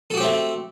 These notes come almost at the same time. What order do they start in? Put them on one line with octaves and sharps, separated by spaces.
A4 F#4 G4 C4 A3